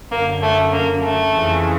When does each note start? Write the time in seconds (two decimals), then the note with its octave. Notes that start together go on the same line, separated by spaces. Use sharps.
0.11 F#2 D3 A#3
0.42 A3
0.72 A#3
1.03 A3
1.34 F2 C#3 E3